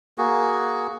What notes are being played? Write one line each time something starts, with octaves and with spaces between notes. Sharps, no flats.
A#3 F#4 G#4